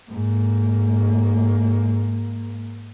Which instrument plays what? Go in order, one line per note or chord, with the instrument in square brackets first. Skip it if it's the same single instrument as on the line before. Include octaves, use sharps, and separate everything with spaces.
[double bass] G#2 A#3